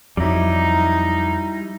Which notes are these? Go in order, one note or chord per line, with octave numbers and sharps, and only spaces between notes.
F2 F#3 G3 D#4 E4